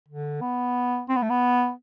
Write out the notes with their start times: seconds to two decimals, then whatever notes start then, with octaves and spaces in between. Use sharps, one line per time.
0.08 D3
0.41 B3
1.09 C4
1.16 B3
1.22 A3
1.30 B3